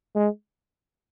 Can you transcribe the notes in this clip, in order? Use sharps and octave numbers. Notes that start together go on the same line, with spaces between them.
G#3